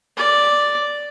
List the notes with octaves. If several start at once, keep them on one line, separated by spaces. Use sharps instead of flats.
D5